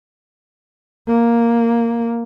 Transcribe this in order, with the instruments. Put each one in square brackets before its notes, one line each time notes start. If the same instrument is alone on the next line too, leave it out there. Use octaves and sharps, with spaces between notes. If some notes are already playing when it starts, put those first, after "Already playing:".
[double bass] A#3